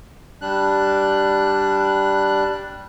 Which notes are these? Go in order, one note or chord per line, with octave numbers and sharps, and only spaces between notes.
G3 D4 F#6